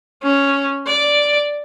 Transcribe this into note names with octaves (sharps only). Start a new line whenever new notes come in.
C#4
D5